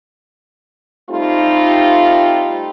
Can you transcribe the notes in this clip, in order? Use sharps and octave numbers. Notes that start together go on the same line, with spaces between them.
G3 A3 C4 D#4 F4